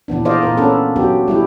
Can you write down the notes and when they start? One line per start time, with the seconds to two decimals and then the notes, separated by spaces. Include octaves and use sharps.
0.08 A#2 E3 B3 D4
0.25 F4 G#4 C5 D5 D#5 F5
0.42 A#2 A#3 A#4
0.57 A#3 B3 C#4 D4 A4 B4
0.96 F#3 B3 D4 F#4 G4
1.28 G3 E4 G4